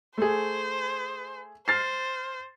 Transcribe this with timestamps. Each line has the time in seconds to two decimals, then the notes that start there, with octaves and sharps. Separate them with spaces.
0.17 A3 G#4 C5
1.68 C5 F6 A6 C7